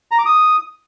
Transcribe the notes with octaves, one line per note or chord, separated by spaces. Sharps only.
A#5
D6
D#6